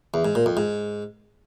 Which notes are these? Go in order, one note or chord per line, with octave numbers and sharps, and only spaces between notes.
E2
G#2
A#2
F2
G#2